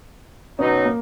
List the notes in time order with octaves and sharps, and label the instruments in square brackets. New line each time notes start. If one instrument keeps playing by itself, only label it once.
[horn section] B2 F#3 B3 D#4 [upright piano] C#4
[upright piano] A#3